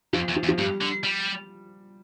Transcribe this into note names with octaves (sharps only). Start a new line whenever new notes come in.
F2 F3
E2
F3
E2
F3
G2 G3
D3
G3